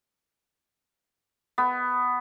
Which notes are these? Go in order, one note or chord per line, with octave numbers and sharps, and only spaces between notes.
B3